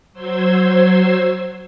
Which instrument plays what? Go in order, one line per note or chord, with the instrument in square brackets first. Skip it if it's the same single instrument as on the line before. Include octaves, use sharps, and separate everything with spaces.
[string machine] F#3 C5 C6 E6 G#6